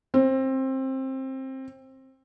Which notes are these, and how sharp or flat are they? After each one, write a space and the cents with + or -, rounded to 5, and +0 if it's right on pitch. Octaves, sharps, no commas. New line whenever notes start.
C4 +20